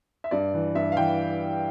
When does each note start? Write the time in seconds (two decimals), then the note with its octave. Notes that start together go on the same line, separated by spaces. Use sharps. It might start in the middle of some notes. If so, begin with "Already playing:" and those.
0.24 E5
0.31 G2 D5
0.54 E3
0.75 G2 E5
0.92 F5
0.97 E3 G5